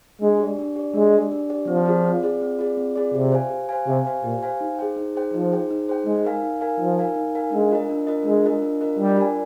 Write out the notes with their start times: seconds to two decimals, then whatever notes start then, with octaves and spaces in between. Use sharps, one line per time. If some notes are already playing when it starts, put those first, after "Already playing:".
0.22 G#3 D4
0.40 G4 D5
0.59 D4
0.76 G4 D5
0.94 G#3 D4
1.13 G4 D5
1.32 D4
1.50 G4 D5
1.68 F3 C4
1.86 F4 G#4 D5
2.04 C4
2.23 F4 G#4 D5
2.41 C4
2.59 F4 G#4 D5
2.77 C4
2.96 F4 G#4 D5
3.14 C3 G4
3.32 C5 F5 G#5
3.50 G4
3.69 C5 F5 G#5
3.87 C3 G4
4.05 C5 F5 G#5
4.24 A#2 G4
4.43 C5 F5 G#5
4.61 D#4
4.79 G#4 C5 G5
4.96 D#4
5.15 G#4 C5 G5
5.33 F3 D#4
5.52 G#4 C5 G5
5.71 D#4
5.89 G#4 C5 G5
6.06 G#3 D#4
6.25 A#4 F5 G#5
6.43 D#4
6.61 A#4 F5 G#5
6.80 F3 D#4
6.99 A#4 F5 G#5
7.16 D#4
7.35 A#4 F5 G#5
7.52 G#3 D4
7.71 F4 A#4 D#5
7.89 D4
8.07 F4 A#4 D#5
8.25 G#3 D4
8.45 F4 A#4 D#5
8.62 D4
8.81 F4 A#4 D#5
8.99 G3 D4
9.17 F4 A#4 D5 G#5